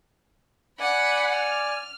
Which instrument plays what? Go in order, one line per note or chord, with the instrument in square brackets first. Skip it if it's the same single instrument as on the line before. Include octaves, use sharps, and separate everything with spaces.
[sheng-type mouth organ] D5 G#5 [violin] F#5 B5
[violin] F6